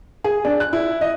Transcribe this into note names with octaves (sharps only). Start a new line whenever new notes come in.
G#4
D4
F#6
E4
D#5